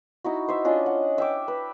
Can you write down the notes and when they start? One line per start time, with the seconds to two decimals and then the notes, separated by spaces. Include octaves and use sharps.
0.24 D#4 E4 F#4
0.48 C5 E5
0.65 C#4 D4 F4 D#5
0.86 F#5
1.18 E5 G5 D6
1.48 B4